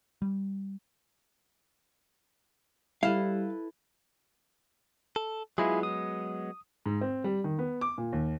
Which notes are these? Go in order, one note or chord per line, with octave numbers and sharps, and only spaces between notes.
G3
G3 E4 A4 B4 F5
A4
F#3 G#3 B3 E4 F4 G#4
D#6
G#2
C4
G3
D#3
B3
D6
A#2
D#2